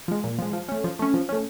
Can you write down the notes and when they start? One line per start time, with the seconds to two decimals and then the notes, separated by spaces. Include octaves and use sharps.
0.08 F3 G#3
0.24 A#2
0.39 F3 G#3
0.53 F3
0.68 A3 C#4
0.84 F3
0.99 A3 C#4
1.14 F3
1.29 A3 C#4